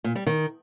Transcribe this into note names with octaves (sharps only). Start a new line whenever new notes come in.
A#2
G3
D#3